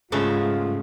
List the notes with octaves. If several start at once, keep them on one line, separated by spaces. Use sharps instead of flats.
G#2 C#3 A3 B3 F4